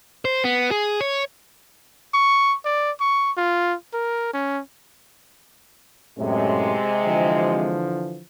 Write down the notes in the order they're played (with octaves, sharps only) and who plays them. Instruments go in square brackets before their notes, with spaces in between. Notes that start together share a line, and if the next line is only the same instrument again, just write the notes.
[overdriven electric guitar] C5
B3
G#4
C#5
[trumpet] C#6
D5
C#6
F4
A#4
C#4
[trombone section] F#2 A2 [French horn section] C3 G#3
[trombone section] D3 E3 F3